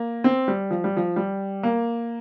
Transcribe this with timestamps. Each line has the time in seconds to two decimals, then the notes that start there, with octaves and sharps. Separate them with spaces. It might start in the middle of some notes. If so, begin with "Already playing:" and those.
Already playing: A#3
0.24 C4
0.48 G3
0.71 F3
0.84 G3
0.97 F3
1.16 G3
1.63 A#3